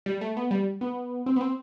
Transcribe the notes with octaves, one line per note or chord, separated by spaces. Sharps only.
G3
A3
B3
G3
B3
C4
B3
C4